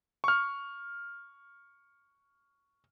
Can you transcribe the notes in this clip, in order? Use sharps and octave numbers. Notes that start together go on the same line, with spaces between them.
C#6 F6